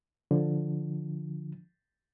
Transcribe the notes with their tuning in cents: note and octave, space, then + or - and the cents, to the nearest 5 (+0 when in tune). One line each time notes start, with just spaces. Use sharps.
D3 +0 F3 +0